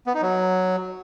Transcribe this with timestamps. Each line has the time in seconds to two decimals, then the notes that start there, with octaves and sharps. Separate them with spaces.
0.07 B3
0.14 D#4
0.22 F#3